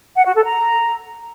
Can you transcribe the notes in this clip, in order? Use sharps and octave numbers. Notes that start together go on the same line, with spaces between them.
F#5
F#4
A4
A#5